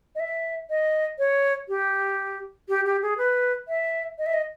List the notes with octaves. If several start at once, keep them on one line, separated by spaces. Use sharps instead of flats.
D#5
E5
D#5
C#5
G4
G4
G4
G#4
B4
E5
D#5
E5
D#5